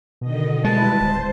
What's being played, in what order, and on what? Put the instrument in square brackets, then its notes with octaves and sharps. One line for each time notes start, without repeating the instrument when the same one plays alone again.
[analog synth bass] B2 [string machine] D3 D#3 D#5
[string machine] G3 E4 B4 [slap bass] G#3 [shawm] A5
[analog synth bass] D1 [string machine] C5